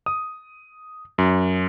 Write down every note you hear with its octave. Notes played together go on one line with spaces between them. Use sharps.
D#6
F#2